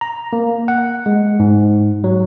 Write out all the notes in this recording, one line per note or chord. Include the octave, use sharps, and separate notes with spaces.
A#5
A#3
F#5
G#3
G#2
F#3